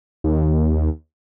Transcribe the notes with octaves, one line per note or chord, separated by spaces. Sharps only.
D#2